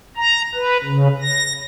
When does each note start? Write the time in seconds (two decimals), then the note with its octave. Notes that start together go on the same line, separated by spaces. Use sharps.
0.17 A#5
0.55 B4
0.83 C#3
1.22 A#6